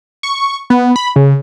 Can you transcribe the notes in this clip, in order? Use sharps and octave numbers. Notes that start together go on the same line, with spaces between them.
C#6
B3
B5
C#3